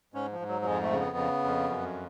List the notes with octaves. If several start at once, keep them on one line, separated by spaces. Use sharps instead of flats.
G#2 C#4
F3
G#2
F#3
F#3
F2 G#3
A3
C#3
B3
C#3
F2
F#2